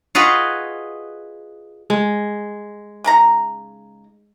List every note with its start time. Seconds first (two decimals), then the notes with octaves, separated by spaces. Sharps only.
0.15 F4 F#4 G#4 B4 D#5
1.90 G#3
3.04 C#3 D#4 A#5